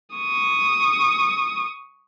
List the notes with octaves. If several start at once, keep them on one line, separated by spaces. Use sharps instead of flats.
C#6 D#6